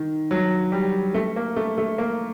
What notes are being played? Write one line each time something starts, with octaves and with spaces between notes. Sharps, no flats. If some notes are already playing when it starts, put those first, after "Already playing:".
Already playing: D#3
F#3
G3
A3
A#3
A3
A3
A#3